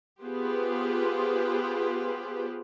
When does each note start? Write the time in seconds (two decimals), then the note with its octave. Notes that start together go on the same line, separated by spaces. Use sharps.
0.23 B3 F4 G4 G#4 B4 C5